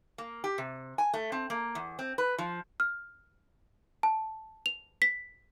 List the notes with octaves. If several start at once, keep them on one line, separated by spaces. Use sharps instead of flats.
A#3
G4
C3
G#5
A3
C4
A#3
E2
C4
B4
F3
F6
A5
F7
B6